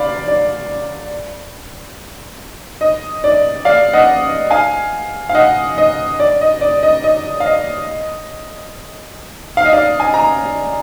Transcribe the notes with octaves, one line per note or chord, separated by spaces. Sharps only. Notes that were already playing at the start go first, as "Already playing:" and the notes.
Already playing: D5 F5 B5 D6
D5
D#5
D5
D5 F5
D#5 F#5
F5 G#5
F5
D#5 F#5
D#5
D5
D#5
D5
D#5
D#5
F5
D#5
F5
D#5
D5 F5
G#5
A#5